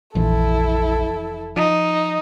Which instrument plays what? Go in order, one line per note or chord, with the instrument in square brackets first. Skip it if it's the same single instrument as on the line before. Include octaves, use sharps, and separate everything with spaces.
[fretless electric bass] F1 E3 F3 [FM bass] A#1 [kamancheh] E4 A4
[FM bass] F3 [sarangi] D#4